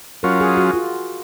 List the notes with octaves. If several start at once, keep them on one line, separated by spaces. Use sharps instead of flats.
F#3 C#4 F4 A#4
G#4
F#4
F4